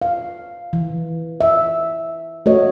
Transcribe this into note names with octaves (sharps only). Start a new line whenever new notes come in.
F5
E3
E5
A3 F#4 C#5 D#5